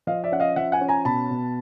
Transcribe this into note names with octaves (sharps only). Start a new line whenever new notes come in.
F3 D#5 F5
D5 E5
C#4 F#5
D#5 F5
F3 E5 F#5
F#5 G#5
C#4
G#5 A#5
B2 A5 B5
B2